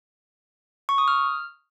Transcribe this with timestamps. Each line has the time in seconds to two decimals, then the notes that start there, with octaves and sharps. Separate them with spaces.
0.89 C#6
0.98 D#6
1.08 F6